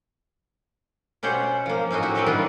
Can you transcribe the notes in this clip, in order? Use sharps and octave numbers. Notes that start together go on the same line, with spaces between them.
B2 C#4 G4 C5 F#5
F3 A#3
A2 C#4 D#4 F#4 D#5
F#4 G4 E5
A#3 C4 F#4 G4 A#4 B4
D#3 E3 G3 A#3 D4 F4